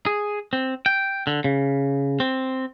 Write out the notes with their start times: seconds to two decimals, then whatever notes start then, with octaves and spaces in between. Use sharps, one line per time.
0.06 G#4
0.53 C4
0.86 G5
1.27 D3
1.44 C#3
2.20 C4